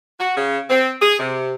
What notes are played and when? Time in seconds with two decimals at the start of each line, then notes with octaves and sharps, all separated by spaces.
0.20 F#4
0.37 C#3
0.70 C4
1.02 G#4
1.19 C3